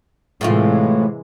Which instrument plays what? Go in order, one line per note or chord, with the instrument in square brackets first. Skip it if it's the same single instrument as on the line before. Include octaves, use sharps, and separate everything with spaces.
[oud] A2 A3 F4 [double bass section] C3 E3 G#3